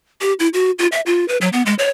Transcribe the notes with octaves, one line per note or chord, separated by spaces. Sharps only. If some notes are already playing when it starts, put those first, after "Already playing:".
G4
E4
F#4
F4
E5
F4
B4
F#3
B3
G#3
C#5